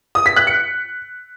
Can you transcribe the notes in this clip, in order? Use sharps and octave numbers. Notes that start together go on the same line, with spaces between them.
D#6
B6
F#6
C#7